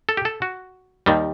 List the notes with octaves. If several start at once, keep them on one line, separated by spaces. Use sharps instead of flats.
A4
G4
A4
F#4
D#2 D#3 G3